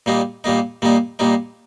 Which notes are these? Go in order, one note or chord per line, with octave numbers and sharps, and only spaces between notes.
A#2 G3 A#3 D#4
A#2 G3 A#3 D#4
A#2 G3 A#3 D#4
A#2 G3 A#3 D#4